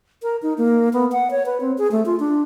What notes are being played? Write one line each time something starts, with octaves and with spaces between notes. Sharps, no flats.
A#4
D#4
A#3
B3
F#5
C#5
B4
C4
G#4
A3
F4
D4